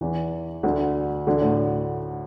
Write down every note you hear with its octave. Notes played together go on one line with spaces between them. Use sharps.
E2 E3
D2 D3
D2 D3
A2